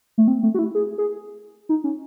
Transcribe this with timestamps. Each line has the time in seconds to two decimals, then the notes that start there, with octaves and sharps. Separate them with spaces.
0.18 A3
0.28 C4
0.43 A3
0.54 F#4
0.59 E4
0.75 G#4
0.98 G#4
1.69 D#4
1.84 C#4